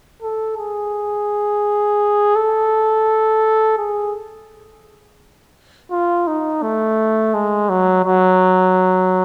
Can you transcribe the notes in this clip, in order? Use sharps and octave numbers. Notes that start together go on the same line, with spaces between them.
A4
G#4
A4
G#4
F4
D#4
A3
G#3
F#3
F#3